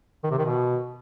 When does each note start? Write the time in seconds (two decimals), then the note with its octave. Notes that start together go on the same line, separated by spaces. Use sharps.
0.24 D#3
0.31 C3
0.38 D#3
0.45 B2